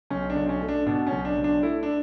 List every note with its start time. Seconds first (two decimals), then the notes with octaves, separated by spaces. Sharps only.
0.10 B1 C#4
0.30 D4
0.36 B1
0.49 C#4
0.62 A3
0.68 D4
0.86 B2 D4
1.07 C#4
1.12 B1
1.25 D4
1.37 B1
1.44 D4
1.63 A3 E4
1.83 D4